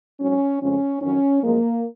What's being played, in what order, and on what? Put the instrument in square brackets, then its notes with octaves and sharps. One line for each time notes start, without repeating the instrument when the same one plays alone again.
[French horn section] G#2 F#3 C#4
F2 C#3 F3 G#3 C#4
F2 D#3 F#3 C#4
F#2 F3 G#3 A#3